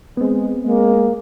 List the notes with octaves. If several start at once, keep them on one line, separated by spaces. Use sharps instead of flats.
G#3 B3 C4
G#3 A#3